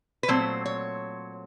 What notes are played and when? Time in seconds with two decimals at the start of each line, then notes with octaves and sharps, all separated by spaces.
0.23 B4
0.28 A#2 F#3 A3 C4 C5
0.66 C#5